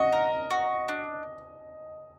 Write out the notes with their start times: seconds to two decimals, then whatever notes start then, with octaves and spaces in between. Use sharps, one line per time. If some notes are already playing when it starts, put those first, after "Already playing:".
Already playing: F#4 D#5
0.12 A#4
0.50 F#4
0.88 D4